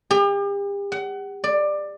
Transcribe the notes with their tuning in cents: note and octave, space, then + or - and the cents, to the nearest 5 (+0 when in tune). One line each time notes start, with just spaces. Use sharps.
G4 +40
F#5 +30
D5 +15